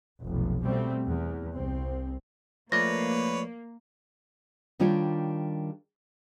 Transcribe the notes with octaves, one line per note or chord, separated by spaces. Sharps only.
F1 B1
B2 G3 A3 C4
E2
C2 C4
F3 A3 A#3 B4 C#5 D5 A#6
D#3 G3 D4 F4 G4 C#5